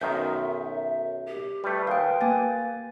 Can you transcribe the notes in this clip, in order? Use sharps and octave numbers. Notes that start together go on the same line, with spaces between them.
B1 F#2 D#3 E5 G6
G4
G3 A3 B4
D#2 G#3 F5 G5
A#3 G4 G#5 A6